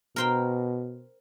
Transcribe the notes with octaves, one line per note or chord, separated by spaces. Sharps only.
B2 A#4 C5 G5